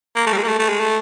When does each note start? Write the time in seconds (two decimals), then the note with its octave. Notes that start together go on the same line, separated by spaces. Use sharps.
0.16 A#3
0.26 A3
0.32 G3
0.37 G#3
0.43 A#3
0.48 A3
0.59 A3
0.69 G#3
0.80 A3